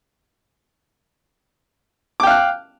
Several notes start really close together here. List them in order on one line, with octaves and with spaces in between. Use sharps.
D6 G5 F5 F#6